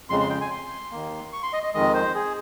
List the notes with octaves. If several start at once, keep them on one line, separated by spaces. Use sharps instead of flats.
F2 C#3 G#3 C6
C6
G5
G#5
C6
D#2 D#3 A#3
C#6
C6
D#5
D#5
F2 D#3 G#3 D#5
C5
G#4